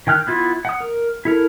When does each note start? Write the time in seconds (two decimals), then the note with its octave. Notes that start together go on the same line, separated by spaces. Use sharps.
0.07 D#3 G5 F6 F#6
0.27 B3 E4 F4
0.65 F#5 D#6
0.81 A#4
1.25 E4 A4 A#4